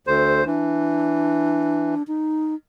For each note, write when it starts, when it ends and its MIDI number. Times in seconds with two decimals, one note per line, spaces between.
0.07 0.44 38
0.07 0.45 69
0.07 0.44 72
0.46 1.94 52
0.46 2.03 62
2.08 2.55 63